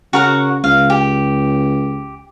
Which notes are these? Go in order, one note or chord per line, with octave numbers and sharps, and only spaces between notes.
C#3 F#4 A#4 F#5
C#2 F5
G4